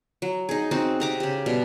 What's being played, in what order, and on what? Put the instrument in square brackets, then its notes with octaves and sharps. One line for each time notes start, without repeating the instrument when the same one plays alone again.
[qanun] F#3
D#4 G#4
C4 D#4 F#4
C3 A#5 D6
C#3 G4
B2 G3